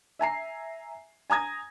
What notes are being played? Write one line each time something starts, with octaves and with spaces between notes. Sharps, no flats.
E5 G#5 A#5 C7
G#5 A#5 D#6 G#6 A#6